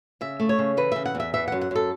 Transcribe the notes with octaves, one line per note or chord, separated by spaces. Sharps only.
C#3 E5
A3
C#5
C#3
E3 B4
C#3 E5
F#5
E2
E5
E3 E5
F#2 F#5
F#5
F#2 A4